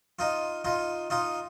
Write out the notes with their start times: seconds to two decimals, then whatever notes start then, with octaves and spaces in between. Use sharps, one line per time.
0.19 D#4 F4
0.64 D#4 F4
1.10 D#4 F4